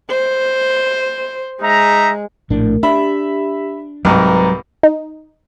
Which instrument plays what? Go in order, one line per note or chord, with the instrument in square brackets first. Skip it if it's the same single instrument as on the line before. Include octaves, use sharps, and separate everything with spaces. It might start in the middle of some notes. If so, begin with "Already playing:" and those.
[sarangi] C5
[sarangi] G#3 [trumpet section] D#4 E5 A#5
[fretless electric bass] A#1 A2 D4 [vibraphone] A3 A#4
[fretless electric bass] D4 [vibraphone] G4 [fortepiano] E5 B5
[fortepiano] C2 G#2 [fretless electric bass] F#3 [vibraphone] B4 A#5
[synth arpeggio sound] D#4